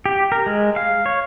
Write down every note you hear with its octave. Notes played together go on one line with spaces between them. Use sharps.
G4
A#4
G#3
F5
C#5